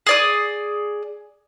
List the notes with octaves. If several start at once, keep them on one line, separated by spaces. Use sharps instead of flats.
G#4 D5 D#6